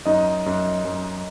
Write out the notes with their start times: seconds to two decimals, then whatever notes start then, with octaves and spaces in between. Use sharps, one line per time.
0.06 F#2 D#4 D#5
0.46 F#2
0.85 F#2